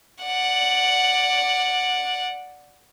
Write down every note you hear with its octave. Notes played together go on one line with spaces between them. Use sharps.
D5 F#5